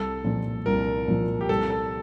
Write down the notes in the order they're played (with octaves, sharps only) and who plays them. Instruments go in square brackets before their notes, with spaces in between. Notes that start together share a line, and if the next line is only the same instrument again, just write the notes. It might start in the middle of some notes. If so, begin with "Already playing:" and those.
Already playing: [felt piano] C2 [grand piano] A4
[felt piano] A#2 F3
[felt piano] C2 [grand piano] A#4
[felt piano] A#2 F3
[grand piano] G4
[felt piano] C2 [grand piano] A4
[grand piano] A4